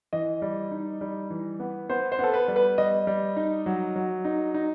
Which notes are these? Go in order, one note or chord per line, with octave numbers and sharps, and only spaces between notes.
E3 D#5
G3
D#4
G3
E3
B3
B3 C5
C5
B3 A4
B4
G3
B4
G3 D#5
G3
D#4
F#3
F#3
D#4
D#4